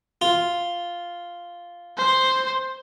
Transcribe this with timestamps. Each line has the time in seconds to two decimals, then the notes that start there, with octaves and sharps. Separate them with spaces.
0.21 F4
1.97 C5